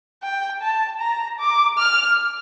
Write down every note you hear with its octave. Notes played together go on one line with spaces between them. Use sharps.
G5
A5
A#5
D6
F6